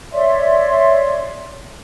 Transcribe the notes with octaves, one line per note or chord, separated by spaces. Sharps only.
C#5 D5 E5 C6